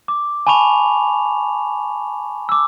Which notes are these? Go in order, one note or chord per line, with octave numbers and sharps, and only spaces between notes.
D6
G#5 A5 B5 C#6 F7
D6 E6